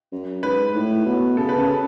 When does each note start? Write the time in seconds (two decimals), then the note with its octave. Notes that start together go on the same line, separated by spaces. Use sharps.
0.12 F#2
0.43 G#2 B4
0.74 A2
1.06 B2
1.37 C#3 A4
1.49 B4
1.58 C#3 A4